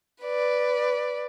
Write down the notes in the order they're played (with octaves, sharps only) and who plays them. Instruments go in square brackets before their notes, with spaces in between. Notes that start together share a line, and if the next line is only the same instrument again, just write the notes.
[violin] B4 D5